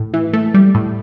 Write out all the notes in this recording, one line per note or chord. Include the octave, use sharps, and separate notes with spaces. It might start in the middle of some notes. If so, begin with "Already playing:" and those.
Already playing: A2
E3
A3
G3
A2